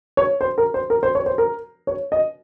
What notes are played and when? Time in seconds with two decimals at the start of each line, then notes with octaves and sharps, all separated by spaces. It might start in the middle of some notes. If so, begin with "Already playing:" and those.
0.17 C#5
0.41 C5
0.58 A#4
0.74 C5
0.90 A#4
1.03 C5
1.15 C#5
1.26 C5
1.38 A#4
1.87 C#5
2.12 D#5